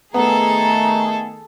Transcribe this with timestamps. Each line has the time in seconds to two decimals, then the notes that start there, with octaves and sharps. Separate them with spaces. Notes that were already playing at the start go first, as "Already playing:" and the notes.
0.14 D#3 A3 B3 G#4 A4 A#5